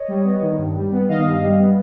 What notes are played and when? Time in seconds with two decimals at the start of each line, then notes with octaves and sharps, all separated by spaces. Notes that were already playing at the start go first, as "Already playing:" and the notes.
Already playing: C#5 D#5
0.08 G3
0.24 B3
0.42 D#3
0.58 G2
0.75 G3
0.92 B3
1.08 D#3 D#5 F5
1.25 G2
1.42 G3
1.59 B3